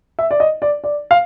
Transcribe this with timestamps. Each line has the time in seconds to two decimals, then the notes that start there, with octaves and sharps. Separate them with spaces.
0.19 E5
0.31 D5
0.40 D#5
0.62 D5
0.84 D5
1.11 F5